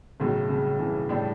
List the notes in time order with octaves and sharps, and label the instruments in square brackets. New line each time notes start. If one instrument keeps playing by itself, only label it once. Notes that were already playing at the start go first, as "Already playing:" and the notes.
[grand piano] B1 A2 F#3 [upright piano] C#3
[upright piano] C#3
C#3 E3
[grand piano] A2 G3 D4